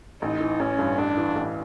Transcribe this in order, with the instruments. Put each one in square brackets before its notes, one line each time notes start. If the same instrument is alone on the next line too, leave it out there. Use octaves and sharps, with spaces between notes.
[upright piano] A1 [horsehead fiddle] D#4
[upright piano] E3
[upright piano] A1 [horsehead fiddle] C#4
[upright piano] G2
[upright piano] A1 [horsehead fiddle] D4
[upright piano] E3
A1